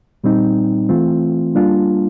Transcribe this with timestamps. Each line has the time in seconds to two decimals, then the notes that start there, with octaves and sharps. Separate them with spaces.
0.24 A#2 G3 C4 D#4
0.89 E3 A3 C4 F4
1.55 G3 A#3 D4 F4